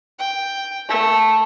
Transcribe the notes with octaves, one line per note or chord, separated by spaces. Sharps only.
G5
A3